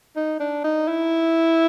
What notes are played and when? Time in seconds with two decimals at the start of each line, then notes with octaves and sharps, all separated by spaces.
0.16 D#4
0.40 D4
0.64 D#4
0.88 E4